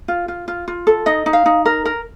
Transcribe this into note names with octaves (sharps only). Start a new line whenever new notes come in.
F4
F4
F4
F4
A4
D#4 D#5
D#4
F5
D#4
A#4
A#4